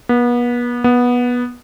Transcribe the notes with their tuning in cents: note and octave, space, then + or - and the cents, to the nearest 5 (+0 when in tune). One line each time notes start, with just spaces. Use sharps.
B3 -35
B3 -15